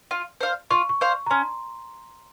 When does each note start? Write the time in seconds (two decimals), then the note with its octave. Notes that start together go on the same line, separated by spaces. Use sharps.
0.11 F4
0.40 C5 F5
0.71 F4 C#6
0.89 C#6
1.01 C5 F5
1.26 A#5
1.30 C#4 C6